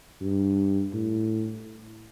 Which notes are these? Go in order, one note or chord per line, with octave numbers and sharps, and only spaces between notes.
G2
A2